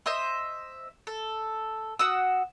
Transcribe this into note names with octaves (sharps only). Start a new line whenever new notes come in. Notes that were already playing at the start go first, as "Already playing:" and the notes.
C5 D#5 E5 C6
A4
F#4 F#5 D#6 E6